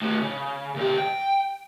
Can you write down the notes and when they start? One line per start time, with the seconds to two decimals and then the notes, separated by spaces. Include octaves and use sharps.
0.02 A2 F#4
0.21 C#3
0.76 A#2 G4
0.98 G5